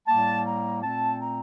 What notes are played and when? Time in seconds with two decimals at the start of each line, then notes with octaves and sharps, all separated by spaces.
0.07 A2 G3 A#3 A5
0.45 A#5
0.82 A#2 A3 C4 A5
1.20 A#5